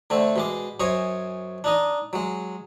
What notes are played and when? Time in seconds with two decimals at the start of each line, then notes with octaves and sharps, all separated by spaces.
0.10 D3 A3 C4
0.36 B2 G#3 D6
0.80 F#2 C5 C#5 D#5 G#5
1.64 D4 D#4 D#5
2.13 F#3 G#3